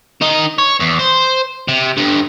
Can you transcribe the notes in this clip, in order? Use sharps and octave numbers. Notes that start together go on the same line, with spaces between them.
D#3 D#4
C#5
E2
C5
C3
G2 D3